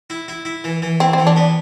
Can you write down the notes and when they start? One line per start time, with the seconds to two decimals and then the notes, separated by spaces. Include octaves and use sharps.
0.10 E4
0.28 E4
0.45 E4
0.64 E3
0.82 E3
1.00 C4 E4
1.13 C4
1.18 E3
1.27 D4
1.36 B3